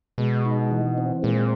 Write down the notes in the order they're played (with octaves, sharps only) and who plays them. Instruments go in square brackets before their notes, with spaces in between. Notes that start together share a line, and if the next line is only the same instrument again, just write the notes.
[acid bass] B2 [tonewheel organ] G#3
[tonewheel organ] D#4
E3
C4
[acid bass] A#2 [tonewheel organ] G#3